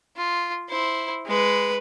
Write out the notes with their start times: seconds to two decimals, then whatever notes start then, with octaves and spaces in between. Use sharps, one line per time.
0.17 F4
0.70 E4 C5
1.27 G#3 B4